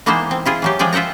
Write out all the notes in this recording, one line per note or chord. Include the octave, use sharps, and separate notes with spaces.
E3 G#3 A#3 B3 D#4 C5
C4
E4 F4 G#4
E3 F#3 G4
F3 G#3 G#4 D5 G5
F4 E5 F#5 G5 A#5